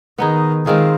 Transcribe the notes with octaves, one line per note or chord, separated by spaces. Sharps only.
D#3 B3 D#4 G#4
D#3 G#3 C4 F4 G#4